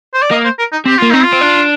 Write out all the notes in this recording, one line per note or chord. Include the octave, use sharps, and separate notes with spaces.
C5
D5
A#3 D#5
C5
A#4
D#4
C4 G4
A#3 F4
C4 D#4
F4
C4
D4